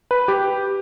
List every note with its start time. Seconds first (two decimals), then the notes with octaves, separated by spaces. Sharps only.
0.11 B4
0.28 G4